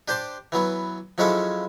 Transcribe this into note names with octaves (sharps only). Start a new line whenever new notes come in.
D4 G4 C5 A5 C6
E3 F#3 B3
F3 F#3 G#3 C#4 E4 A4